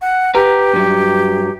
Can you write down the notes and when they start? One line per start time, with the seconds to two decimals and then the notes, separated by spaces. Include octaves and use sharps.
0.01 F#5
0.35 G4 B4 A#5
0.73 G2 F#3